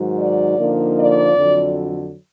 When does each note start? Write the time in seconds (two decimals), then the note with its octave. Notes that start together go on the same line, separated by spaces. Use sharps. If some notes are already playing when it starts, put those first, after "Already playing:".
Already playing: G#2 D#3 F#3
0.18 D5
0.58 D3 F3 A#3 D#4
0.97 D5
1.36 F2 D3 F#3